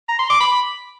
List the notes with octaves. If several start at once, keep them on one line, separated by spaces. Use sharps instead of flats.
A#5
C6
D6
B5